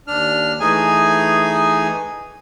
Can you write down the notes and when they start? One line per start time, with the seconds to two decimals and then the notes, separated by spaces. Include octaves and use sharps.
0.08 D#2 D4 F6
0.60 E3 A3 D#4 G#4 G#5